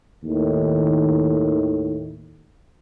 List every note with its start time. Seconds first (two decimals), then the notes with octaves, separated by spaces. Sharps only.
0.23 D#2 A2 D#3